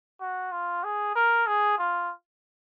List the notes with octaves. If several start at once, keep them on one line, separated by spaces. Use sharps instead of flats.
F#4
F4
G#4
A#4
G#4
F4